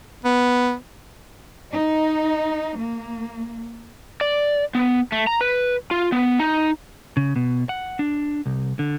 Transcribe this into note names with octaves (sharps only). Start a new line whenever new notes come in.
B3
D#4
A#3
D5
B3
A3
A#5
B4
F4
B3
D#4
C#3
B2
F#5
D4
C2
D3